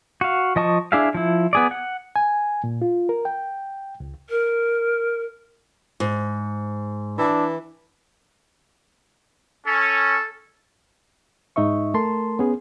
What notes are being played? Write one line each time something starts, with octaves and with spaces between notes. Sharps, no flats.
F#4 F5
F3 D#5 A5 C#6
D4 E4 G#4 E5 F5
F3 E4
B3 G#4 D5
F#5
G#5
A#2
F4
A#4
G5
C#2
A#4
G#2
E3 D4
C#4 A4
G#2 D#4 D#5 E5 C#6
A3 A#4 A5 C6
B3 C#4 G#4